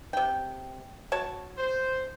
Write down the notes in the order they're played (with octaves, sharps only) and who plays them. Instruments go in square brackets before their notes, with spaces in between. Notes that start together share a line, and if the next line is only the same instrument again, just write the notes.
[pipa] C3 G5
F#4 C#5 A5
[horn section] C5